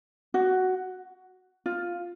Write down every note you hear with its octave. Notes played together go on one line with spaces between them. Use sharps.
F#4
F4